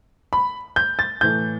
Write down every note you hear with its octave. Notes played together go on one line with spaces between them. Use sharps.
B5
G6
A6
A2 E3 A3 G6